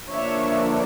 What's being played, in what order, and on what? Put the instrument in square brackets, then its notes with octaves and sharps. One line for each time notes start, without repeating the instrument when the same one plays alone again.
[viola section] D3 F3 A#3 D4 C#5 E5